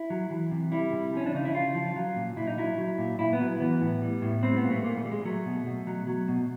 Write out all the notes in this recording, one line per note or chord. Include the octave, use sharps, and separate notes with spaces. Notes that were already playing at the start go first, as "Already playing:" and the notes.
Already playing: E4
F#3
E3
C3
G3 E4
C3
F3 C#4
D4
C#3 D#4
E4
C#3 F4
F3
F#3
A#2
A#2 E4
D#4
F#3 E4
F#3
A#2
A#2 E4
B3
F#3
E3 B3
A2
G3
A2
G3 C4
B3
A#2
A3
A#2 A#3
A3
G3
G#3
F#3 A3
B2
B2
F#3
F#3
B2